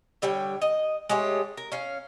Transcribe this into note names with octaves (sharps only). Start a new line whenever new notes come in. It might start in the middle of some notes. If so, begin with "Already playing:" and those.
D3 G3 C#5 G5
D#5
G#3 A3 G4 C#5
A#4
C#4 F5